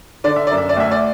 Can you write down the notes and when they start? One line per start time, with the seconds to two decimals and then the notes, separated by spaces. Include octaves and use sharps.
0.24 D3 D5
0.36 E5
0.47 F#2 D5
0.58 E5
0.69 D5
0.77 D2 E5
0.91 D5